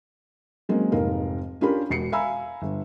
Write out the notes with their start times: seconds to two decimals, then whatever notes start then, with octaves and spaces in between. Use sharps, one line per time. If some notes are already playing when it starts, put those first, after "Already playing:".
0.69 F#3 G#3 A#3 C4 C#4
0.92 F1 G#2 A#4 F5
1.61 C#4 D4 F4 G4 A#4 B5
1.90 E1 F#4 C7 C#7
2.12 E5 F5 G#5 A#5 B5 E6
2.62 G1